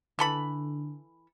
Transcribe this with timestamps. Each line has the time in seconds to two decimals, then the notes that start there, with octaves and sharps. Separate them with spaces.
0.19 D3 E3 A4 B5